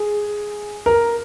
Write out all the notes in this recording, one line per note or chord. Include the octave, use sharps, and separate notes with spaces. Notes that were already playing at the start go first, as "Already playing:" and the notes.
Already playing: G#4
A#4